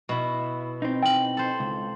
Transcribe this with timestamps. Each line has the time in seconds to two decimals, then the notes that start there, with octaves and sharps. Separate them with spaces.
0.09 B2 E4
0.82 C4 D#4
1.03 G5 F#7
1.37 A4 C5
1.60 C#2